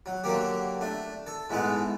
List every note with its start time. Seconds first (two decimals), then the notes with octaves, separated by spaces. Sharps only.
0.06 F#3
0.24 D3 F#3 A#3 G4
0.81 A3 D4
1.27 A4
1.50 G#2 E3 G#3 A3 B3 D#4